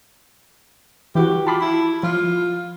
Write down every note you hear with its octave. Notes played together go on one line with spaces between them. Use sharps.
E3 E4 F#4 G4
F4 A5 B5 D6
E4
F3 F4